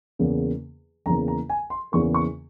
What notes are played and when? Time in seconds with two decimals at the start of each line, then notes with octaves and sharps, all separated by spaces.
0.19 E2 C#3 E3 A#3
1.06 E2 C#3 E3 A#3 A#5
1.28 A#5
1.50 G#5
1.70 C6
1.92 E2 C#3 E3 A#3 C#6
2.14 C#6